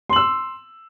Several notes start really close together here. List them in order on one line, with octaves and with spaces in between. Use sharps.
C6 F#7 E6